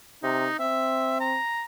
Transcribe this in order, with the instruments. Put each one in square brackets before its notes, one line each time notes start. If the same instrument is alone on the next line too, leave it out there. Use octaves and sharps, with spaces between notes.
[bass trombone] C3 [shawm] D#4
[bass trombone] C4 [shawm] E5
[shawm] A#5